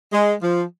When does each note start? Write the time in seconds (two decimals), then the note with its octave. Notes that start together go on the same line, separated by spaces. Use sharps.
0.13 G#3
0.42 F3